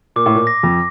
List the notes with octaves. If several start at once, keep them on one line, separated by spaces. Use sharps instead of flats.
A#2 D6
A2
A#2
A#6
F2